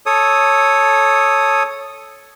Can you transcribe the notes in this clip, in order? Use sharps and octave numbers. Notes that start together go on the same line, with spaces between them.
A4 C#5 D#6